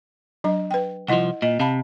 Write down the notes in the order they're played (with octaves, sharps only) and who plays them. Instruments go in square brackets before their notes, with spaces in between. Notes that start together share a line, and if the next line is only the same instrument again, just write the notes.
[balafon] F#3 D4 D#5
B4 G5
[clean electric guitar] C2 F3 [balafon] E4 D#5 F#5
[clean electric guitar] A#2 [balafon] D#5
[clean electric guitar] C3 [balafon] F5 A5 B5